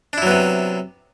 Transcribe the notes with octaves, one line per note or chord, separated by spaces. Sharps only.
C3 F#3 B3 D4 E4